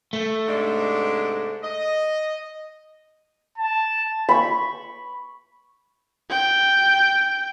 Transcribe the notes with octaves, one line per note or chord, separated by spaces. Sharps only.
A3
G#2 C3 D4
D#5
A5
B5 C#6
G5